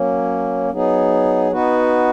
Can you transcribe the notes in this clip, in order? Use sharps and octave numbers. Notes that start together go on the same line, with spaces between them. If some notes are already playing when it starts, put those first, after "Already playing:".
Already playing: F#3 A#3 C#4
F#3 B3 D#4 G#4
B3 D#4 F#4 B4